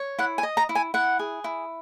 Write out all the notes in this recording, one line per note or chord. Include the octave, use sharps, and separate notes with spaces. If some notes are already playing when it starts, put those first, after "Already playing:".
Already playing: C#5
E4 F#5
G#5
D#5
A#5
E4
G#5
E4 F#5
G#4
E4